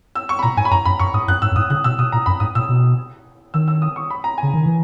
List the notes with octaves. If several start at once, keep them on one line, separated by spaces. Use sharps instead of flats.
E6
C#6
B5
A#2 A#5
G#2 G#5
B5
F#2 A#5
F#2 B5
F#2 C#6
G#2 D#6
F#2 F#6
G#2 E6
F#2
G#2 D#6
C#3 F#6
B2 E6
B2 D#6
A#2 A#5
F#2 B5
G#2 D#6
A#2 E6
B2
D#3 E6
E6
D#6
C#6
B5
A#5
C#3 G#5
D#3
E3